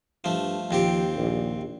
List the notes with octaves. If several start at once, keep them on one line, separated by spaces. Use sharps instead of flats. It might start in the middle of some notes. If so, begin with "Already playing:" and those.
G2 F3 A3
D#2 F3 C4 G4
A#1